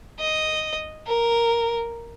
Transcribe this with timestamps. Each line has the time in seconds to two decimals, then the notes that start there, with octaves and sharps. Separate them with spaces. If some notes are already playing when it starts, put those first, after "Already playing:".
0.19 D#5
1.07 A#4